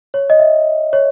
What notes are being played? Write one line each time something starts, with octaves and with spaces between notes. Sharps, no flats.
C#5
D#5
E5
C#5